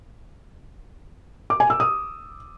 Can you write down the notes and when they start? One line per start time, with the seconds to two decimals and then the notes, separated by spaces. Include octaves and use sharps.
1.50 D6
1.60 G#5
1.70 E6
1.80 D#6